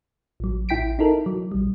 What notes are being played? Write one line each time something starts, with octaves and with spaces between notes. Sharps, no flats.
A1 F#3
A1 E4 G5 B6 D7
D#4 E4 A4 A#4
F#3
A#1 G3